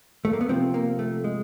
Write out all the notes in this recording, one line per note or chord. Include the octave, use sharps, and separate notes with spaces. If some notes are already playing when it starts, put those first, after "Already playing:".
A3
A#3
B3
C3 F3 C4
A#3
A3
G#3